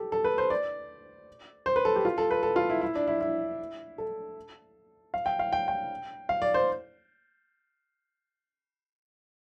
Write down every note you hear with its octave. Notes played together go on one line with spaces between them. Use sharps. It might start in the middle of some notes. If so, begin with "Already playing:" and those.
Already playing: G4 A4
A4
B4
C5
D5
C5
B4
A4
G4
F4
A4
B4
A4
F4
E4
E4
D4
E4
E4
A4
F5
G5
F5
G5
G5
F5
D5
C5